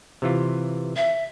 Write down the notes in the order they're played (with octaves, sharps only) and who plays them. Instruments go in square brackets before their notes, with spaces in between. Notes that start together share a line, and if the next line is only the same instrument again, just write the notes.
[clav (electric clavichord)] C3 E3 F4
[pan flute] E5